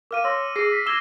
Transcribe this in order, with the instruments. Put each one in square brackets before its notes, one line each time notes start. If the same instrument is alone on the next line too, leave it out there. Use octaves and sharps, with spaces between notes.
[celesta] A#4 F5 [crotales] D6 F6 D#7
[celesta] C#5 C6 A#6 [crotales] E6
[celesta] G#4 [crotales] A#6 C7
[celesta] B6
[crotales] D6 E7 G7 [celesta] E6 G#6 A#6